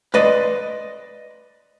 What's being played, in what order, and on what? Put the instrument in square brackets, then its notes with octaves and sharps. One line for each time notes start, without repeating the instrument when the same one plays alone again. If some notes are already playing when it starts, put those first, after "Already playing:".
[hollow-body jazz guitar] B4 D5 D#5 C6